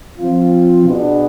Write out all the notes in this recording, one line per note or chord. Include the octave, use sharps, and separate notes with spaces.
F3 C4 F4
B2 B3 D4 G#4